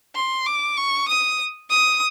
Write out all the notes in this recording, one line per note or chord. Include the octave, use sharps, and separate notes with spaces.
C6
D6
C#6
D#6
D#6